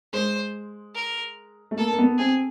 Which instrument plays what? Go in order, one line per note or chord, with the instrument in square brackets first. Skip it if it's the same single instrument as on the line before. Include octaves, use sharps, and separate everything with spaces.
[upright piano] G#3 [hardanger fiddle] C5
[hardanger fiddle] A#4
[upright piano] A3
[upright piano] A#3 [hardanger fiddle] A4
[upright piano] A#3
B3
[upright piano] C4 [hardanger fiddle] G#4